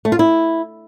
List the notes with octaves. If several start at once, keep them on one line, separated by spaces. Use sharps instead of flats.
A3
F4
E4